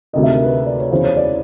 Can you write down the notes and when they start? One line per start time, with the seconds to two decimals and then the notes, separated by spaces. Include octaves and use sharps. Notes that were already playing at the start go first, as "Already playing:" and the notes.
0.13 D2 C3 D#3 D#5
0.23 E5
0.33 A#4
0.43 B4
0.66 D5
0.79 C#5
0.91 E2 C#3 E3 C5
1.04 C#5
1.17 D5